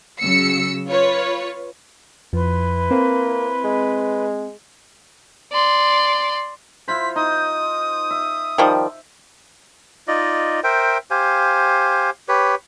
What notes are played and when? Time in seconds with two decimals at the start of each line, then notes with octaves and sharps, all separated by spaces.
0.21 C#3 F#3 E6 C#7
0.88 F4 B4 C#5
2.33 F2 F3 E4 B4 C6
2.91 A#3 C4
3.64 G#3
5.52 D5 C6
6.88 E4 F4 C5 B6
7.16 D#4 D#6
8.10 E5
8.58 D#3 F3 G3
10.08 D#4 F4 D5 D#5
10.64 A#4 C5 E5 G5
11.11 G4 C5 F5 G#5
12.28 G4 B4 C#5